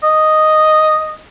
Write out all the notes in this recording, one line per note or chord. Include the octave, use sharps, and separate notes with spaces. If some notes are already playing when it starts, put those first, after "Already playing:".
D#5